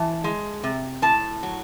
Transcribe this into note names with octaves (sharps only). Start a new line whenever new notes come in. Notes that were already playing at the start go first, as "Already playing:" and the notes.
Already playing: E3 A5
G#3
C3
A2 A5
F#3